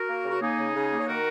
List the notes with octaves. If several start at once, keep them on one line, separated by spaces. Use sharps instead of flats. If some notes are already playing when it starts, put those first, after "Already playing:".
Already playing: F#4 A#4
A#3
C#3
F#4
A#3 D#4 G#4
C#3
C#3
A#3
C#5
D#3 F#4 A#4